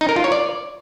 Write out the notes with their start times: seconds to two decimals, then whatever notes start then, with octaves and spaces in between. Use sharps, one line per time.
0.01 D#4
0.09 A#4
0.16 F4
0.24 C#5
0.32 D5